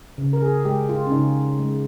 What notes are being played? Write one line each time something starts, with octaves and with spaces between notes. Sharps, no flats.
C#3
A#4
G#4
G#3 G4
F4
C#4
C#3 D#4
G#3